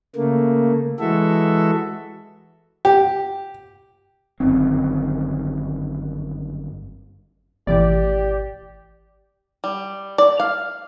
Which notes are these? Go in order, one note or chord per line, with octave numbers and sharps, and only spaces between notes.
C#3 A3 A#3
E3 G#3 F#4 A4 E5
G4
G1 F#2 D#3 C4
G#1 B2 E3 A3 G4 D5
G3
D5
F5